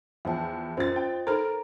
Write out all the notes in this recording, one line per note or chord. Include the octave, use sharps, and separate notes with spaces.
E2 F3 E5 G5
F#2 F4 C5 D#5 A6
G5
D#4 A4 A#4 C5 A#5